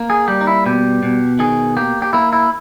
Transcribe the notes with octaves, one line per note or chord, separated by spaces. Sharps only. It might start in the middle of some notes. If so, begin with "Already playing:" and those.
Already playing: A#3
G#4
G3 G4
D#4
E4
B2 G4
B2
D#3 G#4
A#3 G4
G4
A#3 E4
E4